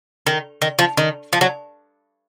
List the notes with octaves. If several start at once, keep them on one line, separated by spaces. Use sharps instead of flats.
D#3
D#3
F3
D#3
F3
F#3